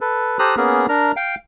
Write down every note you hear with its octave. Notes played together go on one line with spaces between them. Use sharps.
A4 B4
G4 A4 C5 A#5 D#6 F#6
A#3 B3 C#4 G#4 A#4
D4 A#4 A#5
F5 G5